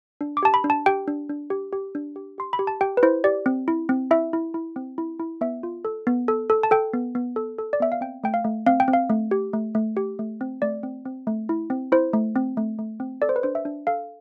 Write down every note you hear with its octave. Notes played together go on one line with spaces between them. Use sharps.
D4
D6
G4 A5
B5
D4
A5
G4 G5
D4
D4
G4
G4
D4
G4
G4 C6
B5
G4
A5
G4 G5
B4
E4 C5
G4 D5
C4
E4
C4
E4 E5
E4
E4
C4
E4
E4
B3 E5
F4
A4
B3
A4
A4
A5
A4 G5
B3
B3
A4
A4
D5
B3 E5
F5
C4 G5
A3 G5
F5
A3
C4 F5
G5
C4
F5
A3
G4
A3
A3
G4
A3
C4
A3 D5
C4
C4
A3
E4
C4
E4 C5
A3
C4
A3
A3
C4
A4 D5
C5
B4
D4 C5
E5
D4
A4 F5